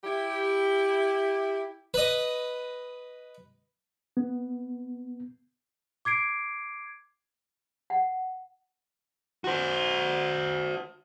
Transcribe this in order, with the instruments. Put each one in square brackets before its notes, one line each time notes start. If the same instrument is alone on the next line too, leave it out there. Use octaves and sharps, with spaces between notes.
[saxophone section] E4 G4
[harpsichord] B4 D#5
[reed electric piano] B3
[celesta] D6 G#6 C7 D7
[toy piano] F#5
[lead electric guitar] F#4 C5